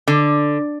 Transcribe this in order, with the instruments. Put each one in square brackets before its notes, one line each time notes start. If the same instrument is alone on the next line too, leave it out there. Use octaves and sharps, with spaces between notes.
[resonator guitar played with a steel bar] D3